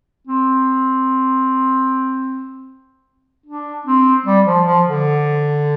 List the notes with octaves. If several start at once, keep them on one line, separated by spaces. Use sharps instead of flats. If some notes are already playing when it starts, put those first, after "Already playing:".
C4
D4
C4
G3
F3
F3
D3